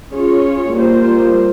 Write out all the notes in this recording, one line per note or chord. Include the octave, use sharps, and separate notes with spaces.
C#4 F4 G#4 C#5
G3 A#3 F4 C5